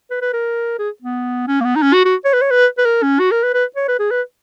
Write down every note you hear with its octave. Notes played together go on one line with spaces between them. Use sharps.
B4
B4
A#4
G#4
B3
C#4
A#3
B3
D#4
C#4
F#4
F#4
C#5
B4
C#5
B4
B4
A#4
C#4
F#4
A#4
B4
B4
C#5
B4
G#4
B4